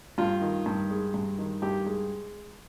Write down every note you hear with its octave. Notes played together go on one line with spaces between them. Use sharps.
G2 F4
D#3
G2
G#3
G2
D#3
G2 G4
G#3